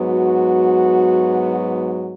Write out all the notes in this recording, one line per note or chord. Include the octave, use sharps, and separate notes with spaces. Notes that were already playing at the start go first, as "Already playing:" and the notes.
Already playing: G#2 F#3 B3
F#4